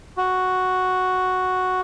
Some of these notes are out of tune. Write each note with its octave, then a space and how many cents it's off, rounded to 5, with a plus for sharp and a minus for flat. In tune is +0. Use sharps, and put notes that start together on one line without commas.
F#4 +0